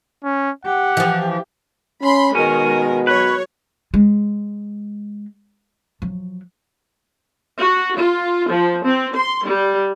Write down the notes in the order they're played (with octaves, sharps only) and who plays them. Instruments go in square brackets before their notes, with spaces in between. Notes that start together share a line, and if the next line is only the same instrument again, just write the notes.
[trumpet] C#4
[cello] G4 [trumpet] F#5
[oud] E3 F3
[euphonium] C#4 [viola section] B5 C6
[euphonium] B2 [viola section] D#3 G#3 A#4 [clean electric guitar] C#4
[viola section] F#3 C#5 [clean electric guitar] B4
[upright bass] G#3
F3 F#3
[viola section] F#4
F4
F3
C4
C6
G3